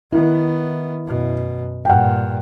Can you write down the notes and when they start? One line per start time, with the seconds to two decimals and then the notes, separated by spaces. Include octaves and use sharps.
0.12 D#3 B3 E4
1.05 F#2 B2
1.85 G2 A#2 F#5 G5